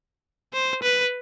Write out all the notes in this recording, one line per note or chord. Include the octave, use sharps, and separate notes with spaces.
C5
B4